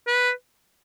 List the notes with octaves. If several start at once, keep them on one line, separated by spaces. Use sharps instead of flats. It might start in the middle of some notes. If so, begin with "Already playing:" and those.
B4